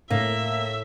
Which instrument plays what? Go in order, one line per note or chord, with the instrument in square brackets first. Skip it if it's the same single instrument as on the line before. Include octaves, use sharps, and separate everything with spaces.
[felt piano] A2 [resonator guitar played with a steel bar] A#3 [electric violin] E5